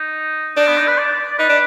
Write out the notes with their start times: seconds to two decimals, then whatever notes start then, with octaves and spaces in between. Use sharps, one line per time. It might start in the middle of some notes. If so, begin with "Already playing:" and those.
Already playing: D#4
0.56 D4 D#4
0.68 B3
0.78 D#4
0.88 B4
0.98 D5
1.12 D5
1.31 D5
1.38 D#4 B4
1.49 D4